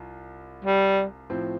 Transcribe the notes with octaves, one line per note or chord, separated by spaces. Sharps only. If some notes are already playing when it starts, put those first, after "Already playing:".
Already playing: C2 F4
G3
A2 F3 C4